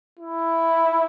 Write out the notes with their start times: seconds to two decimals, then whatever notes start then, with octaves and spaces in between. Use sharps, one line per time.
0.19 E4